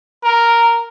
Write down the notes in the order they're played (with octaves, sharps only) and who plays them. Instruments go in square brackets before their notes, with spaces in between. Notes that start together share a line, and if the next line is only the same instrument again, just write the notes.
[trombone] A#4